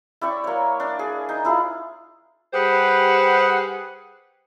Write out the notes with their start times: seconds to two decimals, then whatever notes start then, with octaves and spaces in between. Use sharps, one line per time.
0.21 E4 D5 G5 C#6
0.44 A#3 C#5
0.80 D4
0.99 G#4
1.29 D#4
1.45 E4 F4 G#4
2.53 G3 G4 G#4 B4 C5 F#5